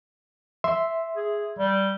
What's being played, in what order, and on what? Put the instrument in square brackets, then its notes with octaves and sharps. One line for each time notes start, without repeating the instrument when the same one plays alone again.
[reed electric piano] E5 C6
[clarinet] G#4
G3